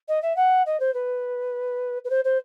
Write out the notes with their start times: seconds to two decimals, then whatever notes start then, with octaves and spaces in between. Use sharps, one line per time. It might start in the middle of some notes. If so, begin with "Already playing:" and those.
0.08 D#5
0.22 E5
0.36 F#5
0.66 D#5
0.80 C5
0.94 B4
2.05 B4
2.10 C5
2.25 C5